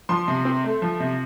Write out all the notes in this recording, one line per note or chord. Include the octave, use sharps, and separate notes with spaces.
F3 C6
C3
C4
A3
F3
C3